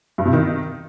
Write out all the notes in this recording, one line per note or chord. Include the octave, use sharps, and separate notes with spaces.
G2
C3
D#3